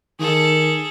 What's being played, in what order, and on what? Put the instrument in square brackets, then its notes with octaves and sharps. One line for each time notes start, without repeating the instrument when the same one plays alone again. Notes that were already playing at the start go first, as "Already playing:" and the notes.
[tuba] D#3 [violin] G#4 A4